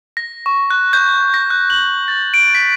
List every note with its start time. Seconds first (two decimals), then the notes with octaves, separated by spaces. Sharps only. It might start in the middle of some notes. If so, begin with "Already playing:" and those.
0.17 A#6
0.46 C#6
0.70 F#6
0.93 G6
1.34 A#6
1.50 F#6
1.70 F#7
2.08 A6
2.34 D7
2.55 B6